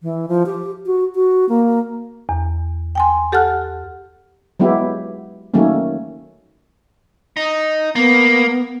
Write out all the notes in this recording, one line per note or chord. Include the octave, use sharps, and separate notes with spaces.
E3
F3
G4
F#4
F#4
A#3
E2
G5 G#5 C6
G4 A4 F#5 A5 F6 F#6
F#3 G#3 B3 E4 G4
D#3 F#3 A3 A#3 C#4
D#4
A#3 B3